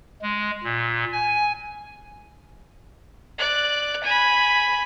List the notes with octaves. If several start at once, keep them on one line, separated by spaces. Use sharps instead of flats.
G#3
A#2
G#5
D5 F#6
G#5 B5